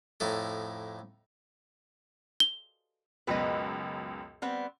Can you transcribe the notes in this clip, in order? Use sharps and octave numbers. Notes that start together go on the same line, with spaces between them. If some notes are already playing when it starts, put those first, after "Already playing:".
F2 A2 D#4 A4
G7
C#2 F#2 B2 B4 D#5
G3 B3 C4